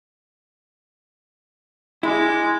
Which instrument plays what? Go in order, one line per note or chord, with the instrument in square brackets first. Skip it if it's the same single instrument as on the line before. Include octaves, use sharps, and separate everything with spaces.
[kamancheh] G#3 D6 [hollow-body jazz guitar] E4